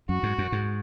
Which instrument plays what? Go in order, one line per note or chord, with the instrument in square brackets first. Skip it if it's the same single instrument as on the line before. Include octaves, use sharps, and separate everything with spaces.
[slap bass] F#2 [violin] F#4
[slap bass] G#2
F#2
G#2